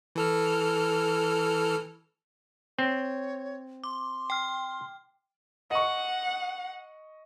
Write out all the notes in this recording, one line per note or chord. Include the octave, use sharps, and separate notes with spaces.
E3 A4 F6
C4 C#5
C6 D6
G5 F6
D#5 F#5 C#6